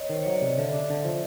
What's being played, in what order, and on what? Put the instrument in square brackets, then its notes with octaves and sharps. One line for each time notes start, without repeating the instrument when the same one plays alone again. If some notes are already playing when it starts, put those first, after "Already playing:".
Already playing: [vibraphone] C#5 D#5
[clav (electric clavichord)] D#3 [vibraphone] C5
[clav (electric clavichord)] F#3 [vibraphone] C#5
[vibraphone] D5
[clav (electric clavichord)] C3 [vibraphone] D#5
[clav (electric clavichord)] D3 [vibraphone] D5 E5
[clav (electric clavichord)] D4
D3
F3